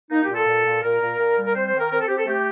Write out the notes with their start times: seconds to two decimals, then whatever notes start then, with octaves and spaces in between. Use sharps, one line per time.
0.11 A#3 D#4
0.24 G4
0.29 A#2
0.35 A4
0.47 A#2
0.66 A#2
0.83 A#2 A#4
1.01 A#2
1.19 A#2
1.37 G3
1.45 A#4
1.55 C4 C5
1.67 C5
1.73 D#3
1.79 A#4
1.91 C4 A#4
2.00 A4
2.08 C4 G4
2.17 A4
2.27 A3 G4